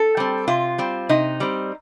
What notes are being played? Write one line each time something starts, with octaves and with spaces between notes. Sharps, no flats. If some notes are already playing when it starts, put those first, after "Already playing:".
Already playing: A4
G3 C4
C3 F4
G3 C4
C3 D#4
G3 C4